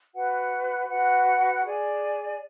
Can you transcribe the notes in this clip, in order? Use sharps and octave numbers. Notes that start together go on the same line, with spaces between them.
F#4 B4 F#5
F#4 B4 F#5
G#4 D5 G#5